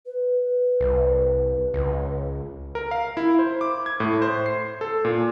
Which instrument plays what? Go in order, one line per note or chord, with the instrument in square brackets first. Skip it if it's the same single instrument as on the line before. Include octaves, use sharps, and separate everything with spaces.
[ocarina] B4
[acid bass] C2
C#2
[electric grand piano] A#4
F5
E4
C5
D6
G#6
A2
C5
C7
A4
A#2